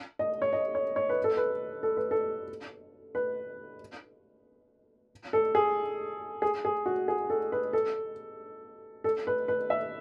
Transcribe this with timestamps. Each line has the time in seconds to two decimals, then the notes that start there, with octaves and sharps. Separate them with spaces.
0.19 D#5
0.42 C#5
0.53 D#5
0.75 C#5
0.96 C#5
1.09 B4
1.24 A4
1.37 B4
1.83 A4
1.97 B4
2.11 A4
3.15 B4
5.33 A4
5.55 G#4
6.42 G#4
6.65 G#4
6.86 F#4
7.08 G#4
7.30 A4
7.52 B4
7.73 A4
9.04 A4
9.27 B4
9.48 B4
9.70 E5